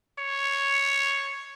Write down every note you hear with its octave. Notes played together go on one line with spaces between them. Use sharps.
C#5